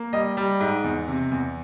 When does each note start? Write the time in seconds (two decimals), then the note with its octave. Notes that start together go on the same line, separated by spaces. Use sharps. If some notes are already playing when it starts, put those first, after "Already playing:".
Already playing: A#3
0.13 G3 D#5
0.37 G3
0.60 G#2
0.84 E2
1.07 C3
1.31 E2